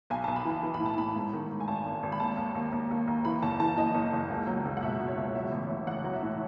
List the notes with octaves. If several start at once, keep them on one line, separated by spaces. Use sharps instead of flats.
B1 G#5
A5
B1
B5
E3 A5
E3
B5
A2
A5
A2 B5
G#2
D#3
D#3
G#5
G#1 A5
G#1
G#1
B5
D#2 A5
D#2
D#2
D#2
D#2
D#2
E3 B5
F#1 A5
E3 A5
E3 D#5
F#1
F#1
C#2
F#3
C#2
F#5
B2 E5
B2
C#5
C#2
F#3 E5
A1
A1
A1 F#5
F#3
E5
A2